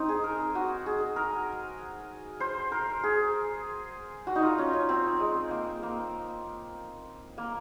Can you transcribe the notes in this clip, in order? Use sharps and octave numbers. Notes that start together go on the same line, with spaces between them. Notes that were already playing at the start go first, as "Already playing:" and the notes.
Already playing: C4 D#4
G#4
A#4
F#4
G#4
A#4
C5
A#4
G#4
F#4
D#4
F4
C#4
C#4
C4
G#3
A#3
A#3
A#3